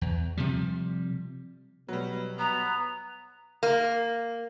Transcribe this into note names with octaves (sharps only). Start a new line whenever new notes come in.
E2
C3 F3 G3
B2 F#3 G3
B3 A#5
A#3